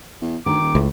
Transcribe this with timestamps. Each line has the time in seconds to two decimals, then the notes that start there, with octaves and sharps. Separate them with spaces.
0.22 E2
0.46 D2 D#3 D6
0.61 D#1
0.75 C#2 A2